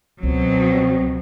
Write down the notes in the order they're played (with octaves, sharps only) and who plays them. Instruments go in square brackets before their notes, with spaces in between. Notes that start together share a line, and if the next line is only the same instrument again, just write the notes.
[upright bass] C#2 [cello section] B2 F#3 [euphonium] C4